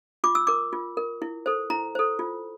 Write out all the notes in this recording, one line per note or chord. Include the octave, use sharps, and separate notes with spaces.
F4 D6
E6
A#4 D6
F4
A#4
E4
A4 C5
E4 A#5
A4 C5
F4